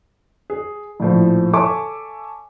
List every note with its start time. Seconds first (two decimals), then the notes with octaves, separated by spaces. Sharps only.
0.50 G#4
1.00 A#1 A2 F3
1.53 A4 C#5 E5 G#5 C#6 D6